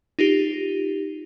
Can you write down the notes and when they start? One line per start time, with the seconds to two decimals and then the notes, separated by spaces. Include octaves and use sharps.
0.19 D#4 F4 G4